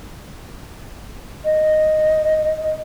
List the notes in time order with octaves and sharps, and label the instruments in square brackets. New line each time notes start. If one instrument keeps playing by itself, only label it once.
[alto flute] D#5